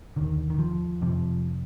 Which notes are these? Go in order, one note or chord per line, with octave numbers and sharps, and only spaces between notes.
D#2 D3 D#3
D#3
F3
F2 C3 F3